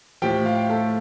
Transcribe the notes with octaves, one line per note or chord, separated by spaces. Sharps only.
A2 F3 G4 G5
F4 F5
A3 A4